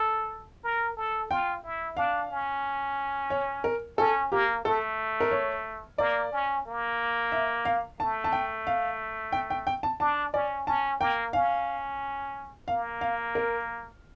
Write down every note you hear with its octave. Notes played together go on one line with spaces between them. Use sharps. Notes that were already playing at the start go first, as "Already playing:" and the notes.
Already playing: A4
A#4
A4
F4 G5
E4
D4 F5
C#4
C#5
A#4
C#4 A4
A#3 G4
A3 A4
A#4
C#5
A#3 D5
C#4
A#3
E5
F5
A3 A5
A5
G5
F5
G5
G5
G5
A5
D4 A5
C#4 D5
C#4 A5
A#3 G5
C#4 F5
A#3 F5
F5
A#4